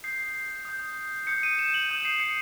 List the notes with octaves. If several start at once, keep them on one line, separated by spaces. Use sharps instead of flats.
D#6 G6 C7
D#6 G6
D#6 G6 C#7
D#7
E7
F#7
D#6 G6
C7
C#7